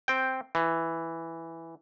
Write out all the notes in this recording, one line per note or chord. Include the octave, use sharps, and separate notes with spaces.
C4 G5
E3